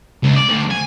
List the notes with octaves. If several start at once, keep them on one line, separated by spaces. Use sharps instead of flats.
C#2
D5
D2
G#5